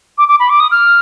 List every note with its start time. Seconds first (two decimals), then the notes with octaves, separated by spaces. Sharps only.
0.18 D6
0.28 D6
0.40 B5
0.50 D6
0.60 D#6
0.71 F6